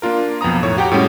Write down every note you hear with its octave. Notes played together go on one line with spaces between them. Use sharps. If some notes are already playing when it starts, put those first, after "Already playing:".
A#3 D4 F4 A#4
B1 F2 B3 A#5 D#6
A2 C#5
F#4 G4 F#5 G5 A#5
A2 G3 G#3 C#4 F#4 G4